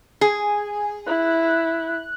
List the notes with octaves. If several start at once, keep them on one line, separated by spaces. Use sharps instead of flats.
G#4 G#5
E4 F#6